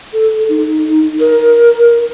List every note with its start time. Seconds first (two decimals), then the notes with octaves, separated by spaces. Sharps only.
0.13 A4
0.49 D#4
1.20 A#4